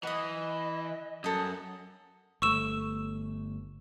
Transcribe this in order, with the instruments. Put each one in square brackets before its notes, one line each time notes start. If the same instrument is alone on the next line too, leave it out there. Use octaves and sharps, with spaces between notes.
[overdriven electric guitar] E3 [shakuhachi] D#5 [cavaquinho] F#5 D#6
[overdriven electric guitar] F#2 [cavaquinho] A4 D#6
[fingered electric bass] G1 A3 [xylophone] C#6 E6 E7